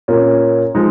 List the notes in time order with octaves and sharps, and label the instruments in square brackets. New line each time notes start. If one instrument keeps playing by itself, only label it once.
[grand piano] A#2 A#3 C#4
F3 G#3 D#4